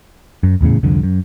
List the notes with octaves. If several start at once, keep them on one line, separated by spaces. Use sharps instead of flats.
F#2
D#1 E2 A2 C#3
C2 F2 D3
F#2